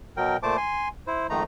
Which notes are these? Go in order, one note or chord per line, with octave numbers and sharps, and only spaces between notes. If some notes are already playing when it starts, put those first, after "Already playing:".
B2 F#3 A#4 G5
A#2 A3 C5 A5 D6
G#5 C6
E4 C5
F2 G#2 D#3 A3 D#4 A#5